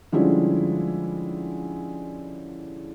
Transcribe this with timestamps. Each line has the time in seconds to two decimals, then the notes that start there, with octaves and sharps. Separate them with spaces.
0.12 D3 F3 G3 G#3 C#4 E4